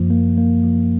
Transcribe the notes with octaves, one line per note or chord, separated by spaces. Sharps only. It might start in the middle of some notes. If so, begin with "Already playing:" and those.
Already playing: F#2 F3 A#3
A#3
A#3
F3